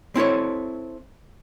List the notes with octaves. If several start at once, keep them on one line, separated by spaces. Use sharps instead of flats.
C4 E4 A4 C#5